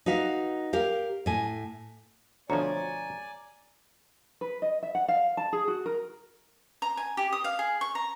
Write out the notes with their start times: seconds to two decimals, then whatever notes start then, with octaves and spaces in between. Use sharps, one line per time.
0.06 D#4 F#4 B4 F5
0.73 G4 A#4 F5
1.26 A2 G#5
2.50 D2 B2 F3 C#5 D5 G#5 A#5
4.41 B4
4.62 D#5
4.83 E5
4.95 F#5
5.08 F5
5.37 A5
5.53 G#4
5.68 F#4
5.86 A#4
6.82 A#5
6.97 G#5
7.17 G4
7.33 D#6
7.44 F5
7.59 G#4
7.81 C#6
7.95 A#5